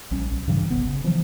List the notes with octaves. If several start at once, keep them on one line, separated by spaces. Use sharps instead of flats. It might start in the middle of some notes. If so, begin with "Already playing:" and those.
A#1 G3 C#4
B1
G2 C#3 E3 G3
F#1 B1 B3
C#3
E3 F3 G3